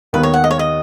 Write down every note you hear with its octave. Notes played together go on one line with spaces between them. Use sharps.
D#2 D#3 B3 B4
C#5
F#5
D#5
C#5
D#5